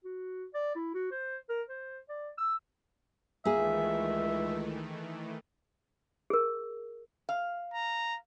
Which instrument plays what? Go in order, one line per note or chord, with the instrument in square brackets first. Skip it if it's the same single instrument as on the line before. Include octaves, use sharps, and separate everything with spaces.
[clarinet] F#4
D5
E4
F#4
C5
A#4
C5
D5
E6
[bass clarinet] C#2 [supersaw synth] D#3 E3 A3 [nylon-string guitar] A#3 G#4 [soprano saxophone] E5
[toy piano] G#4 A#4
[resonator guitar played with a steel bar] F5
[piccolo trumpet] A#5